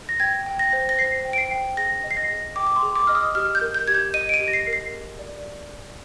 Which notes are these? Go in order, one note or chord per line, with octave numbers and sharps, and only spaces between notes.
A#6
G5 G#6
G5
A#6
C5
A#6
C5 C7
G5
D7
C7
G5
G#4 A#6
D#5
C7
A#6
G#4
G5 D6
D6
C6
G#4
D6
D#5 F6
D#6
G4 F6
G6
A#4
G6
G4 G#6
G6
D#5 D#7
D7
D#7
G4
A#6
C7
A#4
C7
G#4
D5